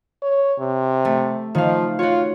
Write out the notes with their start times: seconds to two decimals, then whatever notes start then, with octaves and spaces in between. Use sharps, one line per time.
0.22 C#5
0.59 C3
1.05 A3
1.55 D#3 F3 F5
1.99 F4 F#4 C#5